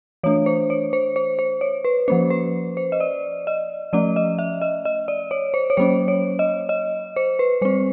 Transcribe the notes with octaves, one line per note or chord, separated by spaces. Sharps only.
E3 A3 D4 C#5
C5
C#5
C5
C5
C5
C#5
B4
F3 A#3 C#4 C5
B4
C5
D#5
D5
D#5
F3 A3 C#4 D5
D#5
E5
D#5
D#5
D5
C#5
C5
C#5
F#3 A#3 C#4 C5
C#5
D#5
D#5
C5
B4
G3 C4 C5